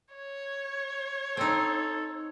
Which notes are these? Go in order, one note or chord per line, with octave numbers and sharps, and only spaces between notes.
C#5
C4 D#4 A4